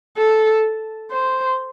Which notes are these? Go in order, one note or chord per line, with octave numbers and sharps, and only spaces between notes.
A4
C5